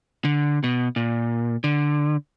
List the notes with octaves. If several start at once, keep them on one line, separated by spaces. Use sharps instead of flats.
D3
B2
A#2
D3